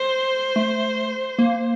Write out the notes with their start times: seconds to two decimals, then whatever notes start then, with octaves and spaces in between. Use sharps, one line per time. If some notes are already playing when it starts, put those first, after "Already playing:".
Already playing: C5
0.56 A3
1.39 A#3